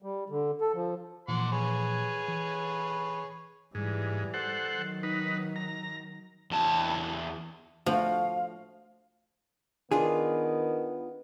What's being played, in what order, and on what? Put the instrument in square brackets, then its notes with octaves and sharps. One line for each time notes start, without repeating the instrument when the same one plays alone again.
[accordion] G3
D3
A4
F3
[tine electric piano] A#2 E3 F3 [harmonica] F#5 C6 D6
[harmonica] G#4 B4 C#5
[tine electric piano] E3
[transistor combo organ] G#2 [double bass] E3 G3
[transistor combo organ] A4 C5 F#5
[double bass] D#3 F#3
[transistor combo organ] D#4 B4
A#5
[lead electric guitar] E2 A5
[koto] F3 [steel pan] A3 D4 F#4 [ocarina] F5
[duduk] D#3 [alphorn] B3 [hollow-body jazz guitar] D4 F4 G#4